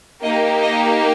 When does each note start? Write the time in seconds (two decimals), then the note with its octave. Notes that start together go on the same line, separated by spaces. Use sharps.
0.22 A#3 D#4 G4 D#5
0.62 D#5